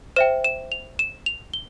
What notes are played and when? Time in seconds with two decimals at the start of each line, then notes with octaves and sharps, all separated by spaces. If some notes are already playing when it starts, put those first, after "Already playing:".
0.16 C5 E5 G5 E7
0.44 E7
0.72 F7
0.99 E7
1.26 F7
1.54 G7